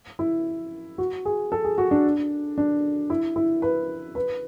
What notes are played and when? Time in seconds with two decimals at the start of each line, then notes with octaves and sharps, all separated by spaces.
0.19 E4
0.98 F#4
1.25 G#4
1.52 A4
1.64 G#4
1.78 F#4
1.91 D4
2.58 D4
3.10 E4
3.36 E4
3.62 B4
4.15 B4